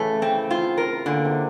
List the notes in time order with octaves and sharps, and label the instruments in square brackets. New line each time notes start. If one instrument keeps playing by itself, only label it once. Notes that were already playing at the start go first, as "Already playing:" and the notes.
Already playing: [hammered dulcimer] A2 C#3 [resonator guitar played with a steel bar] E3 A3
[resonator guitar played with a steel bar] C4
F4
A#4
[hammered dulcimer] A#2 [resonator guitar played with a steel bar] D3
[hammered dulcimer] C3